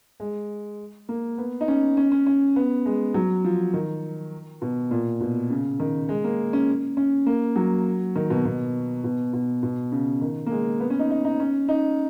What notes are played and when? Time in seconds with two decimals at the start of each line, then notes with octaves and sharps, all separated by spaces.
0.20 G#3
1.09 A#3
1.38 B3
1.61 D#4
1.68 C#4
1.97 C#4
2.12 C#4
2.26 C#4
2.56 B3
2.86 G#3
3.14 F#3
3.44 F3
3.74 D#3
4.62 B2
4.91 A#2
5.21 B2
5.50 C#3
5.80 D#3
6.09 G#3
6.24 A#3
6.53 C#4
6.97 C#4
7.26 A#3
7.56 F#3
8.16 D#3
8.30 B2
8.45 B2
9.04 B2
9.33 B2
9.63 B2
9.92 C#3
10.21 D#3
10.46 A#3
10.51 G#3
10.80 B3
10.90 C#4
10.99 D#4
11.10 D#4
11.25 D#4
11.40 C#4
11.68 D#4